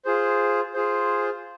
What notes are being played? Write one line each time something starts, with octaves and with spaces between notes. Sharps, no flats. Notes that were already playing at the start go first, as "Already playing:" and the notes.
F4 G#4 C5
F4 G#4 C5